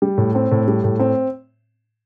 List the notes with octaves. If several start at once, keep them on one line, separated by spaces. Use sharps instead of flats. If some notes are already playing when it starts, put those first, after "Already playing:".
G3
A2
C4
A2
G3
A2
C4